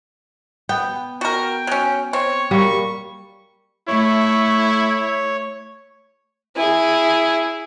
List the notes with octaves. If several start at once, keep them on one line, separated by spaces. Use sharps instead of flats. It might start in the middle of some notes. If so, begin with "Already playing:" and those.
B3 G5
F#4 A#4 G5
F#3 C#4
C4 C#5
G3 A#3 C#6
A3 E4 C#5
E4 G#4